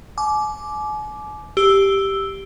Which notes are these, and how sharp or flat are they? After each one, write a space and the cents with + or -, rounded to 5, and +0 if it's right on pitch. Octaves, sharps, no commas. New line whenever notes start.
G#5 +40 D6 +0
G4 +0 E6 +0